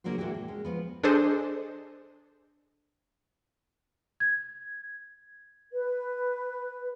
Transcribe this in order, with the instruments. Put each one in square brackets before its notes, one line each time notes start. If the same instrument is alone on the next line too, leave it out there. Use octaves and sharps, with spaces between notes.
[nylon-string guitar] C#3 F#3 A#3 D4 F#4 C5
A#2 E3 G#3 F#4 G4
A4
G#3 C#4
D2 G2 F3 B3
[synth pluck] D4 G#4 A4 C5 D#5
[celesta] G#6
[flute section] B4